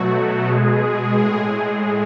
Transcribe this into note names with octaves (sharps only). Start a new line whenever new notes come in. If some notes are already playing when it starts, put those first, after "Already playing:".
Already playing: B2 F#3 A3 F#4
B2 G#3 G#4
A2 G#3